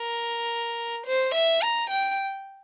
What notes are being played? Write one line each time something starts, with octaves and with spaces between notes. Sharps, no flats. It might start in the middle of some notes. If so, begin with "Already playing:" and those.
Already playing: A#4
C5
E5
A#5
G5